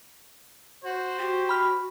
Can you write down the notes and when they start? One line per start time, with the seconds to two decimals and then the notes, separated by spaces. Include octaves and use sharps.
0.85 F#4 C5
1.19 F#4 G4
1.49 B5 F6